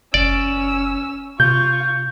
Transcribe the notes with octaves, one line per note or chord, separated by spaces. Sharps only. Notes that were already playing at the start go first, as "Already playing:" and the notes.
F#1 C#4 D5 E6
C3 F4 C#6 G6